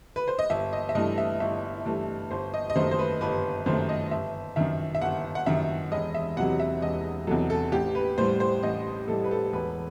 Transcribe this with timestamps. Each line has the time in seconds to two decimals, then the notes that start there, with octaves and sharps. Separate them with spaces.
0.16 B4
0.28 C5
0.39 D#5
0.50 G1 E5
0.73 D#5
0.89 E5
0.95 G2 E3 A3 D#5
1.18 E5
1.40 G1 E5
1.85 G2 E3 A3
2.31 G1 C5
2.54 D#5
2.70 D#5
2.75 F#2 D#3 A3 C5
2.91 C5
2.99 B4
3.21 G1 B4
3.66 F#2 D#3 A3 C5
3.89 D#5
4.11 G1 E5
4.56 F#2 D#3 E5
4.95 E5
5.01 G1 F#5
5.35 F#5
5.46 F#2 D#3 E5
5.92 E1 D#5
6.15 E5
6.37 E2 C3 F#3 F#5
6.60 E5
6.82 E1 D#5
7.27 E2 C3 F#3 A4
7.50 A4
7.72 A1 G4
7.95 B4
8.18 A2 G3 C5
8.40 C5
8.63 A1 D#5
9.08 A2 G3 A4
9.24 B4
9.31 A4
9.53 E1 B4